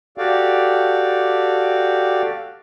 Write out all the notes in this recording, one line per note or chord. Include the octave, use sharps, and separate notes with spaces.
F#4 G4 A4 D5 F5 G5